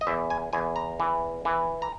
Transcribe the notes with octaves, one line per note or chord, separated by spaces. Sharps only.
D#5
E2 E5
G#5
E2 G#5
A#5
E3
E3
A#5